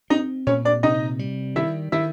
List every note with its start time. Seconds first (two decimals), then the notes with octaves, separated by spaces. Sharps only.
0.10 C4 D#4 D#5
0.47 A#2 C#4 C#5
0.65 D4 D5
0.83 C3 D#4 D#5
1.19 G3
1.56 D#3 E4 E5
1.92 D#3 E4 E5